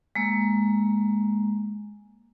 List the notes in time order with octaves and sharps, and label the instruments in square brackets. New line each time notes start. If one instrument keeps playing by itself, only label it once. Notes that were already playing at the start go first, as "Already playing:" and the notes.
[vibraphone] G#3 A#3